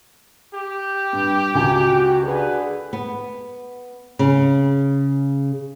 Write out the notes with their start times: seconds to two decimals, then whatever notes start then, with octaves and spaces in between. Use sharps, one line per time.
0.54 G4
1.13 G2
1.55 C#2 F#4 G5 G#5
2.24 D3 G#4 B4
2.93 B3
4.19 C#3